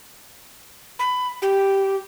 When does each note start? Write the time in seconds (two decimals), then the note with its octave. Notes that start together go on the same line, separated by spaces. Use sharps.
0.99 B5
1.42 G4